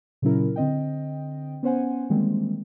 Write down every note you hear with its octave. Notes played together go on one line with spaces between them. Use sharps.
A#2 C#3 F#3 C#4 E4 A#4
D3 C4 D#5 G5
B3 C#4 C5 F#5 G#5
D#3 E3 G3 G#3 A#3 C4